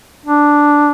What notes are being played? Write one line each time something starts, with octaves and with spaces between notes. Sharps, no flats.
D4